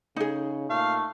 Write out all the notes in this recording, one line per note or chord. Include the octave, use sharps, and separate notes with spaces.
C#3 D#4 G#4
A#2 A3 F5